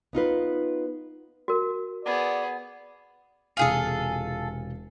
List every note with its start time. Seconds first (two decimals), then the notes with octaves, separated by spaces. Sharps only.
0.13 B3 D#4 F4 B4
1.48 F#4 A#4
2.05 B3 G#4 D5
3.57 E1 C3 F4 G#4 A4 G#5